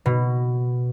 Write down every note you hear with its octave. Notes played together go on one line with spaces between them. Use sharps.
B2